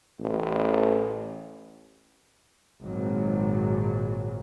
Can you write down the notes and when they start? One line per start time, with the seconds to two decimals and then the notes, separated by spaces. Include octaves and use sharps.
0.20 A1
2.81 G#1 A#2 F#3